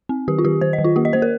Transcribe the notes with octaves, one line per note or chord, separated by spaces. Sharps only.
C4
D#3 G4
F4
D#3 G4
D#3 C5
D#5
D#3
F4
A#3 G4
D#5
A#3 C5
A#4